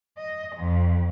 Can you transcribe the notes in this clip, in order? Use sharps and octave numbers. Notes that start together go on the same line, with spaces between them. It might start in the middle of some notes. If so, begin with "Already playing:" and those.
D#5
F2